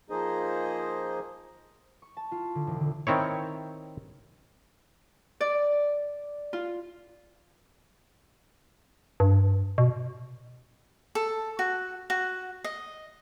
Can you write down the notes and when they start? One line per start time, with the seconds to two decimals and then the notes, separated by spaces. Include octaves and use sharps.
0.10 F3 A#3 D#4 G#4 C5 D#5
2.02 C#6
2.17 A5
2.32 F4
2.55 D3
2.67 E1
2.80 D3
3.07 D#3 C4 E4 C#5
5.40 D5
6.53 F4
9.20 G2
9.78 B2
11.15 A4
11.59 F#4
12.10 F#4
12.64 D#5